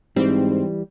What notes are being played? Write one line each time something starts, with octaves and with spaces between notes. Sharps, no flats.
G#2 E3 G3 C4